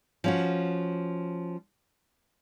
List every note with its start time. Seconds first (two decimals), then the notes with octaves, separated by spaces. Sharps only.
0.24 F3 C#4 F#4